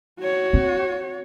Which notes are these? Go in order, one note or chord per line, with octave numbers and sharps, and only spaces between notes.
F#4 C#5
C4